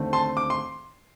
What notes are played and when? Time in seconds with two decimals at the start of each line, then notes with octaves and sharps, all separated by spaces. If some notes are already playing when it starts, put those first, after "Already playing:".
Already playing: D#2 D3 A3 C4
0.13 A5 C6
0.37 D6
0.50 C6